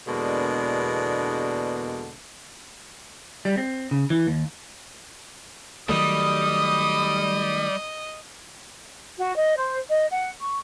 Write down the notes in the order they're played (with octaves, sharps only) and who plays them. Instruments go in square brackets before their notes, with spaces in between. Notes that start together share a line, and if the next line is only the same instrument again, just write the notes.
[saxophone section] E2 B2 D3 G#3 A#3 D4
[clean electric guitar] G3
C4
C#3
E3
D#2
[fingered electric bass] D#3 F#3 A3 [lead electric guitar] G3 [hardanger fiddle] D#5 [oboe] D#6
[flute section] F#4
D#5
C5
D#5
F#5
C#6